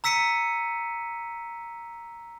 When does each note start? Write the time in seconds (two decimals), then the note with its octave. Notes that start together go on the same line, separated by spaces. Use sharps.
0.04 A#5 E6 B6 C#7 D#7